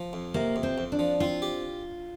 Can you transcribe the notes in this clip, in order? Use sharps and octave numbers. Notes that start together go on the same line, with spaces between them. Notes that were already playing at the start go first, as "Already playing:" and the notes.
Already playing: F3
F2
C3 A#3
F2
C4
F2
D4
F3
C4 F4
G4